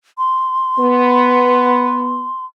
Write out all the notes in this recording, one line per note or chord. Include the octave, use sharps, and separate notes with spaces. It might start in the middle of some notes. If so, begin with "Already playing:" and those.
C6
B3